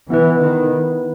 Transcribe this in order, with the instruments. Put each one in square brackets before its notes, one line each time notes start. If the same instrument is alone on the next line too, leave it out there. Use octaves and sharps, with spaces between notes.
[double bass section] E3 [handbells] B3 E4 B4
[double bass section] D#3